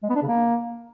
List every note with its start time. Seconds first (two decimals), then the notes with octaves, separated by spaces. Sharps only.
0.03 G#3
0.09 B3
0.16 D4
0.22 C#3
0.28 A#3